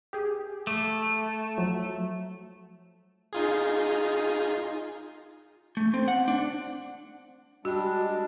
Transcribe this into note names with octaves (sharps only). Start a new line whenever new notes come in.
G4 G#4
A3 D6
F3 F#3
D#4 F4 G#4
A3
C4
F#5
D4
G3 G#3 D4 F#4